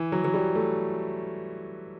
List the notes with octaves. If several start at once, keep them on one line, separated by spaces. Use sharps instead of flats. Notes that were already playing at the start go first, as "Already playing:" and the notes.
Already playing: E3
F#3
F#3
G3
A3